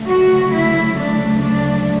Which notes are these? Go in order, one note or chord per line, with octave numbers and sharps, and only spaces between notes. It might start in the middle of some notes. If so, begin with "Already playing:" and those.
Already playing: D2 C#3 F#3 A3
F#4
E4
D4
D4